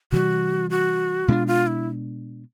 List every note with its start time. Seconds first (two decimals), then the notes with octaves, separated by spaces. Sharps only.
0.12 C3 E3 G3 F#4
0.70 F#4
1.28 B2 G#3 B3 D4 F4
1.47 F4
1.67 E4